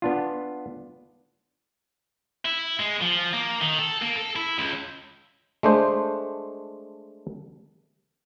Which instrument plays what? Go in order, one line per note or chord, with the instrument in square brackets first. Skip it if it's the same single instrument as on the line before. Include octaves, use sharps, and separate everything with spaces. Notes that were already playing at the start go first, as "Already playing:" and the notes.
[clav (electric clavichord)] B3 D4 F4
[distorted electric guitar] E4
G#3
F3
A#3
D#3
A4
A#3
A4
E4
C#2
[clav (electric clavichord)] G#3 A3 D4 C5